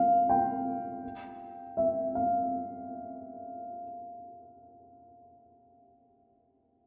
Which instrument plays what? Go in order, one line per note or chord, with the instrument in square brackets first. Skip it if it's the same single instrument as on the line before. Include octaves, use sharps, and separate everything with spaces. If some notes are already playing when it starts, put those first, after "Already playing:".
Already playing: [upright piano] F5
G5
E5
F5